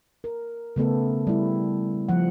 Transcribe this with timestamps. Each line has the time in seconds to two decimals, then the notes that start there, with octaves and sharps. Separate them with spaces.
0.24 A#4
0.76 C#3 A3 B3 A4
1.27 G3 E4
2.09 F3 F#5